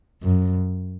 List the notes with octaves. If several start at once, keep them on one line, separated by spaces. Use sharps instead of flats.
F#2